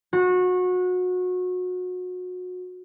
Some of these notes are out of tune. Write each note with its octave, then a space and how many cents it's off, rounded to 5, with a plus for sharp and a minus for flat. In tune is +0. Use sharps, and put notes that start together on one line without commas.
F#4 -25